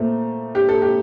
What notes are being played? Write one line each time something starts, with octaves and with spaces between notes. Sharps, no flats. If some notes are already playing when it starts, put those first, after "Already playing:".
Already playing: A#2 A3 C4
G4
A4
G4